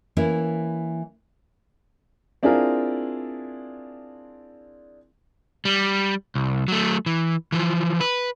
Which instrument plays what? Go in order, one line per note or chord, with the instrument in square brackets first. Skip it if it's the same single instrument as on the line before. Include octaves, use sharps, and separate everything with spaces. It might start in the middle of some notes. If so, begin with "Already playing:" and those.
[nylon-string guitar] E3 A#3 C#4 E4
[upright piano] C4 D4 E4 F4 G#4 A#4
[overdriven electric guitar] G3
C2
F#3 A3
E3
E3 F3
B4